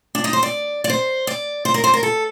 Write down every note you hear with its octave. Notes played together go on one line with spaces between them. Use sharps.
D4
D#4
C5
D5
D5
C5
D5
C5
A#4
C5
A#4
A4